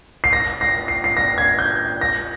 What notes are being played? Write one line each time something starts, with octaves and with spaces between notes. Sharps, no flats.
C7
A#6
A#6
C7
C7
A#6
G#6
G6
A#6